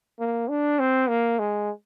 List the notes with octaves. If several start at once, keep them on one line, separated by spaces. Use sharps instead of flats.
A#3
D4
C4
A#3
G#3